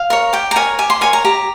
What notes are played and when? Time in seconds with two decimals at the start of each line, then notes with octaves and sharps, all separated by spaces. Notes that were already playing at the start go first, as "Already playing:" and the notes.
Already playing: F5
0.10 A#4 C#5
0.33 G4 G5
0.51 A#5
0.56 A#4 C#5 G#5
0.79 G4 G#5
0.90 C6
1.01 A#4 C#5 G#5
1.13 A#5
1.24 G4 A#5